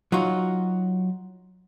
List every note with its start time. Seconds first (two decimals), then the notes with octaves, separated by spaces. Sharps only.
0.12 F#3 D#4 F4 F#4